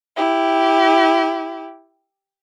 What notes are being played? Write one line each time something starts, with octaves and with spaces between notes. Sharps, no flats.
E4 G4